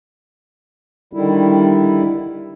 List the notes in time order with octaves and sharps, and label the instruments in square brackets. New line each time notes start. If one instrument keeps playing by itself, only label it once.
[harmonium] D3 D#3 G3 E4